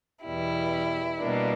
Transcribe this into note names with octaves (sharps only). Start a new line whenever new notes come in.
E2 B2 G3 E4
B2 G3 A#3 D4